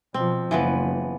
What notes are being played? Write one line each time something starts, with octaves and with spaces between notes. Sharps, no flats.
B2 F3 C4
F#1 E3 F3 B3